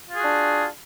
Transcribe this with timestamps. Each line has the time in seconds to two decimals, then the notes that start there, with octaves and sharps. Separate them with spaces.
0.09 F4
0.14 G#4
0.19 F#4
0.24 D4